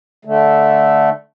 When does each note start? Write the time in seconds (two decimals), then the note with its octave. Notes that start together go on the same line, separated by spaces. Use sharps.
0.25 D3 A3